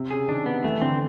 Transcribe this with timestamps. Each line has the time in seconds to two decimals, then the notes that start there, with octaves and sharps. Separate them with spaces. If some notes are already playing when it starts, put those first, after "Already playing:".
Already playing: C3
0.11 C#3 G#4
0.28 D#3 D4
0.46 B3
0.64 E3 A3
0.81 D3 C4